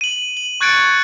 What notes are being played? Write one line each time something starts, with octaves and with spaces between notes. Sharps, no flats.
D#7 F#7
F#7
C#6 F#6 G#6 A6 C#7 D7